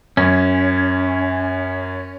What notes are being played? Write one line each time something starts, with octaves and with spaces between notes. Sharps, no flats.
F#2 C#4